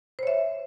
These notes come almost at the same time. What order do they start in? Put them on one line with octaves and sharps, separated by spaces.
C5 C#5 E5